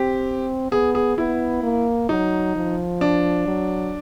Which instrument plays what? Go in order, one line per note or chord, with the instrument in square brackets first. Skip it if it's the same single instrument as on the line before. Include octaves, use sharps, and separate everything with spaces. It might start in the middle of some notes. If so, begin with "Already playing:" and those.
Already playing: [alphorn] C4 [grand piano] G4
[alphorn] B3 [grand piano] G#4
[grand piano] G#4
[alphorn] B3 [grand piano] E4
[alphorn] A#3
[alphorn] F#3 [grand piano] D#4
[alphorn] F3
[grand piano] D4
[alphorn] F#3